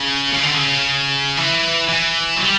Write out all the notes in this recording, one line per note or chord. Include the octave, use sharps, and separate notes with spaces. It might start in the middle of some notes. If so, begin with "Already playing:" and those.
Already playing: C#3
C#3
D3
C#3
E3
E3
F#3
G3